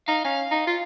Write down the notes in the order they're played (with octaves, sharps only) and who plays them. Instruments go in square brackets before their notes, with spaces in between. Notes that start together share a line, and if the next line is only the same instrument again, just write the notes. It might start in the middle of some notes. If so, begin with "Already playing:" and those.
[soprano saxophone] D#4 [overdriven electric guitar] F5
[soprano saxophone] C#4 [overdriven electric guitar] F5
[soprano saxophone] D#4
F4